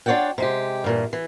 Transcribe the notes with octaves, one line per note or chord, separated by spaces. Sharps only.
D4 F4 C#5 D5 F#5 G5
C3 G#3 G4
G2 A#2 E3
E3